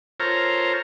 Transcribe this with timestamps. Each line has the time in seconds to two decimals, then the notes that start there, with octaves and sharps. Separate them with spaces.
0.20 F4 A4 A#4 C5 C#5 A#5